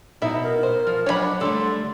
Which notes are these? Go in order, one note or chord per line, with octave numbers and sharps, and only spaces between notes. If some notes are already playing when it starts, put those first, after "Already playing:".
B2 D#4 E4 E5
A#4
C5
F3
F#3 D4 C#5 D#5 E5 F#5 B5
D3 G3 A3 A4 C6